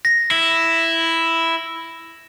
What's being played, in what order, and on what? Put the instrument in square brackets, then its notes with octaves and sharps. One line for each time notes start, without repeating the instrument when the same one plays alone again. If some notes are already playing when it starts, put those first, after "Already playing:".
[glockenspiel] A#6
[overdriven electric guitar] E4